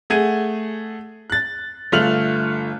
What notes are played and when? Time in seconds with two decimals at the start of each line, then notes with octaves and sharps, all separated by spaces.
0.10 A3 G#4 F#5 G#6 D#7
1.30 F#6 A6
1.92 G1 A3 F4 F6 F7 F#7